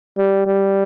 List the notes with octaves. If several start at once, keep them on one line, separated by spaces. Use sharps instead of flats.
G3
G3